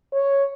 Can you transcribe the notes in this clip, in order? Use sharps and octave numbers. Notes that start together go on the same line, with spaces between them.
C#5